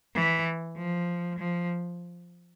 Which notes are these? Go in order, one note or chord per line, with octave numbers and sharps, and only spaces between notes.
E3
F3
F3